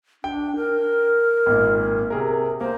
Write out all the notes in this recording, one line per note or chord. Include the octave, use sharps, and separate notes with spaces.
D4 G5
A#4
G#1 A#2
C3 G#4 A#4
A#3 C5